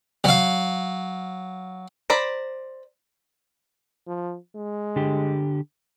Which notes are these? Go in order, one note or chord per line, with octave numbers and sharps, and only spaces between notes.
F#3 F5
C5 D5 A#5 B5
F3
G#3
D3 G4